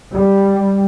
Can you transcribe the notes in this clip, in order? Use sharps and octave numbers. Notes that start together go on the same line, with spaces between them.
G3